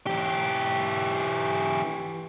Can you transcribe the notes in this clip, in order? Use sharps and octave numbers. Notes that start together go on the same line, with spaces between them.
E3 G4